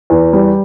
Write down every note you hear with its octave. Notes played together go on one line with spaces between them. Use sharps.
E2
G3